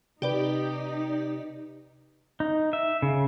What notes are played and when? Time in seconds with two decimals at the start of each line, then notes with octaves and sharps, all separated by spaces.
0.22 C3 D#4 G4 B4 D5
2.40 D#4
2.73 E5
3.02 C#3